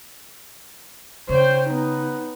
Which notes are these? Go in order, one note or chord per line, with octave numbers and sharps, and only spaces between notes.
C#3 C5 C#5 G5
B3 D#4